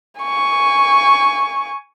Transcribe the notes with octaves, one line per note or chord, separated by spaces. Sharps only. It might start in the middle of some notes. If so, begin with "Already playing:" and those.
G#5 C#6